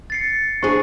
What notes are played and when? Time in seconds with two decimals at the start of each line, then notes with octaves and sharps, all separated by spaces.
0.10 A6 C7 C#7
0.63 D4 E4 G#4 C5 C#6